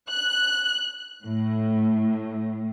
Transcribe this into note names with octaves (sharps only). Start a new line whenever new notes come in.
F#6
A2